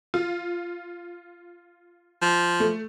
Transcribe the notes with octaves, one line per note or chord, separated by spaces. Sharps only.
F4
F3
A3